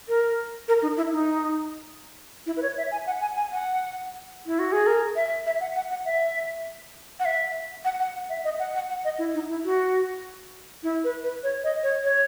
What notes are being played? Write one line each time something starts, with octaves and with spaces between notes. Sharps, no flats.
A#4
A#4
D#4
E4
D#4
E4
B4
C#5
E5
G#5
F#5
G#5
G#5
F#5
E4
F#4
G#4
A#4
E5
E5
F#5
F#5
F#5
E5
F#5
E5
F#5
F#5
F#5
E5
D#5
F#5
F#5
F#5
D#5
E4
D#4
E4
F#4
E4
B4
B4
C#5
D#5
C#5
C#5